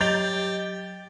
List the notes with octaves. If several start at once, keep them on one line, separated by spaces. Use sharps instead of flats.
F#3 G4 D#5 G6 A6 F7